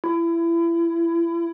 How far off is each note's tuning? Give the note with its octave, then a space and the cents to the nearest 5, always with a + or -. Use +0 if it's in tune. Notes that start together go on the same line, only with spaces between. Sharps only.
E4 +30